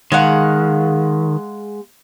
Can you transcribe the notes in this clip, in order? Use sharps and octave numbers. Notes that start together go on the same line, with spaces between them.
D#3 G#3 F5 F#5